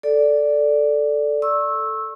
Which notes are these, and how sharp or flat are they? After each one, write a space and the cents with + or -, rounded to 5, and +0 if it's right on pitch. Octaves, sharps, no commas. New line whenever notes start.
A4 +0 D5 +0
C#6 -30 E6 -5